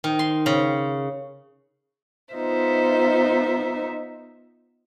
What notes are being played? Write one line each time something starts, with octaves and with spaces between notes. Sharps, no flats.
D#3
C6
C#3
B3 D#4 F4 C5 E5